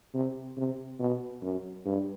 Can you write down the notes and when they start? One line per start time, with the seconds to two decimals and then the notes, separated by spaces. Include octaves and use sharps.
0.14 C3
0.57 C3
0.99 B2
1.42 F#2
1.85 G2